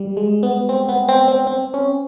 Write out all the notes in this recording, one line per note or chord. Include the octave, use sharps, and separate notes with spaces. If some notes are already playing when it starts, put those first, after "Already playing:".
Already playing: G3
G#3
B3
C4
B3
C4
C4
C4
C#4